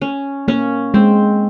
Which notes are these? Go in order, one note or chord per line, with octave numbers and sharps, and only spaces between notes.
C#4
A#3 C#4
G#3 C4